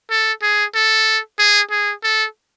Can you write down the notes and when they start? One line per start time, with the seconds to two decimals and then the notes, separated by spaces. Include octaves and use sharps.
0.10 A4
0.42 G#4
0.74 A4
1.39 G#4
1.71 G#4
2.03 A4